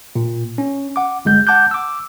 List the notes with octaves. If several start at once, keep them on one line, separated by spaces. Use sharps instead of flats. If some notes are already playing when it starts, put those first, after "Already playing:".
A#2
C#4
F#5 D6
G1 G#3 G6
F#5 A5 D6 F#6 G6
D6 E6